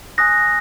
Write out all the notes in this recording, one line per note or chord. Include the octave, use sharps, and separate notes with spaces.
G#5 D#6 F#6 A#6